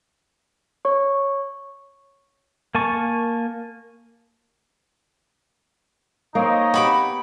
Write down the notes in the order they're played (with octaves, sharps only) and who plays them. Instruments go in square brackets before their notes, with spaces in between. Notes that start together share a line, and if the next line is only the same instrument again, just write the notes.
[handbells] C#5 C#6
[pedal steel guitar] A#3 G#5 A5 C#6
[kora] A#3 C4 [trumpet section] D#4 C#5 D#5
[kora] B3 G4 [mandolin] F#4 B5 D6